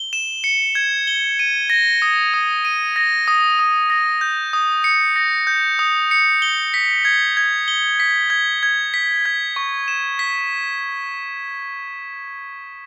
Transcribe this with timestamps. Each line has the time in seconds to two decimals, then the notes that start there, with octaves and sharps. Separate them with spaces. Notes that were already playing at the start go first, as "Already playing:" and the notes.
Already playing: G7
0.13 E7
0.44 C#7
0.75 G#6
1.07 G7
1.39 D#7
1.70 A#6
2.02 D#6
2.34 D#6
2.65 D#7
2.96 A#6
3.28 D#6
3.59 D#6
3.90 A#6
4.21 G6
4.53 D#6
4.84 C#7
5.16 A#6
5.47 G6
5.79 D#6
6.11 C#7
6.42 G7
6.74 B6
7.05 G#6
7.37 G#6
7.68 G7
8.00 B6
8.30 G#6
8.63 G#6
8.94 B6
9.26 G#6
9.56 C#6
9.88 E7
10.19 B6